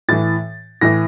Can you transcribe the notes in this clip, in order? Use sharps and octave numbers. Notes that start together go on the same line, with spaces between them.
A2 E3 A6
A2 E3 A#6